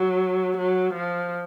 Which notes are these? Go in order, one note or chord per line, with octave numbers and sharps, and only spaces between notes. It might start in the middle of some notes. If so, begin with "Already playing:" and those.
Already playing: F#3
F#3
F3